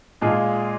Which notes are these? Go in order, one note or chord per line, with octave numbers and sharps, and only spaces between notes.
A#2 G#3 F4 G#4